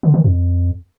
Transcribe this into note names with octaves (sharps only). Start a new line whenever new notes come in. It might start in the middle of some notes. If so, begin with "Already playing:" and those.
D3
D#3
F2